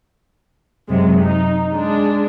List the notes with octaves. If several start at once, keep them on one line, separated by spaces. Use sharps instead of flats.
F#2 C3 F#3 G#3
D#4
G#3 D4